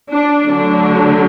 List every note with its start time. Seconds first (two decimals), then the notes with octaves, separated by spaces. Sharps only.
0.11 D4
0.48 D3 F#3 A3 D4